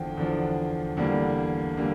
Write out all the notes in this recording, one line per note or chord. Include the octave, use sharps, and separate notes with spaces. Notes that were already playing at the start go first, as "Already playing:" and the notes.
Already playing: E2 D3 F3 G5
E2 D3 F3
E2 D3 G3 A#3
D3 G3 A#3